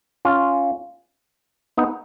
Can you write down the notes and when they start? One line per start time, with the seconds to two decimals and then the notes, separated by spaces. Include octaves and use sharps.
0.25 C#4 F4
1.77 B3 D#4